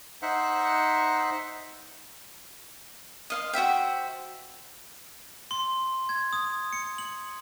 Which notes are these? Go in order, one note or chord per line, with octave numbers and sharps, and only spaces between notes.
D#4 C5 E5 F#5
D#5 F5 C6
F#4 C5 E5 G5
C6
G#6
D#6
C#7
F#7